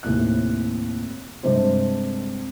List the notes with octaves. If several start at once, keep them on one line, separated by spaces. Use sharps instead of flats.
D#2 A2 C3 F#6
G2 C3 G#3 D4 C5